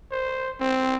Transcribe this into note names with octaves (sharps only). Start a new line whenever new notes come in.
C5
C4